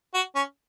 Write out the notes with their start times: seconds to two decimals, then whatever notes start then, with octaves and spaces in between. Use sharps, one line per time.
0.14 F#4
0.35 C#4